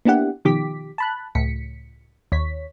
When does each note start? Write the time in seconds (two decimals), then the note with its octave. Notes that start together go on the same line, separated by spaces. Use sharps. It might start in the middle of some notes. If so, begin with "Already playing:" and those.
0.05 A#3 B3 D4 E4 G4 F#5
0.45 B2 D#3 F3 G4 D6 B6
0.98 A5 B5 F#6
1.35 C#2 A2 B6 C#7
2.32 D#2 C#5 B6